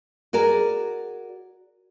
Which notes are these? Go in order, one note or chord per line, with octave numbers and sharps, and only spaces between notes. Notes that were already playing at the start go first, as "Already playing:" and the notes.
F#4 G#4 A#4 D5